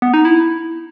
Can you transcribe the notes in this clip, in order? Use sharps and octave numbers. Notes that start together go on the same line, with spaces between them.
B3
D#4
E4